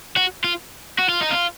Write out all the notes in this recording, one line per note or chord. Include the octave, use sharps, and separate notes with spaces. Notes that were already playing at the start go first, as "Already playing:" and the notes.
F#4
F4
F#4
F4
D#4
F4